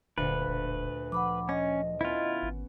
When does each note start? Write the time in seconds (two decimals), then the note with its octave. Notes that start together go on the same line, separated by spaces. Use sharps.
0.18 D#1 D2 A#2 B4
0.48 E1
1.12 F3 F#5 B5 D6
1.49 C#4 D#5 A#6
2.01 B3 C#4 E4 F4
2.43 G#1